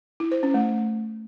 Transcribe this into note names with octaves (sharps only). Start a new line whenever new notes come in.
E4
C5
C#4
A3